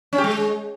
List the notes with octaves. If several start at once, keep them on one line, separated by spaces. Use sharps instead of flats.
C#4
G4
G#3